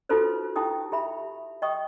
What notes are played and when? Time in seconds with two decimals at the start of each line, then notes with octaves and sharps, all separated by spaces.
0.09 D#4 F4 F#4 A4 B4 C5
0.56 D#4 E4 G4 G5 D#6
0.92 G4 E5 B5
1.62 D#5 G5 C#6 D#6